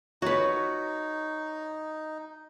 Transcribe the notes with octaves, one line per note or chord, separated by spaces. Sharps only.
D#4 F#4 B4 C#5